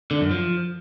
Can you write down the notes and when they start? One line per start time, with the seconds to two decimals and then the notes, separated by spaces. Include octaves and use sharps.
0.11 D3
0.21 F#2
0.31 F3